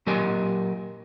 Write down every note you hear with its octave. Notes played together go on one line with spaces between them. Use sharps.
A#2 F#3 G4 A#4 D#5 G#5